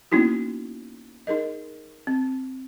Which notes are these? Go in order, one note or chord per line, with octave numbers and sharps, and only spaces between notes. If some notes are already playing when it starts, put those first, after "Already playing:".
A#3 B3 C#4 D#4 E4 F#4
D#4 G#4 A#4 D#5
C4